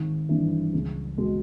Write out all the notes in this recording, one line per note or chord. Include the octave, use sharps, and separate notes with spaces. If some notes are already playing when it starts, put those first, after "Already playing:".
Already playing: G#1
G2 E3
C#2
B2 G#3